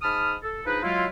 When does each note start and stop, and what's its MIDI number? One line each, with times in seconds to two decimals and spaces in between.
0.02 0.34 44
0.02 0.34 81
0.02 0.34 83
0.02 0.34 87
0.02 0.34 89
0.43 0.62 69
0.65 0.82 53
0.65 0.82 62
0.65 0.82 63
0.65 0.82 68
0.65 0.82 71
0.83 1.07 54
0.83 1.07 56
0.83 1.07 64
0.83 1.07 65